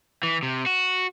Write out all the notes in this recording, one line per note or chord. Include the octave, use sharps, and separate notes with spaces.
E3
C3
F#4